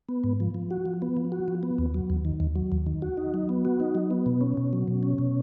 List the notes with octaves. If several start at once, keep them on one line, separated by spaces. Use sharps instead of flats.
B3
G#2
F3
F3
F#4
F3
B3
F3
F#4
F3
B3
D#2
F#3
D#2
D#3
D#2
F#3
D#2
D#3
F#4
D#4
F#3
B3
F#4
D#4
F#3
B3
B2
C#4
B2
F#3
B2
C#4
B2